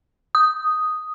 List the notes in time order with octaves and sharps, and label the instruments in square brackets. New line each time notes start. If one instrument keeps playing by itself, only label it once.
[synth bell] D#6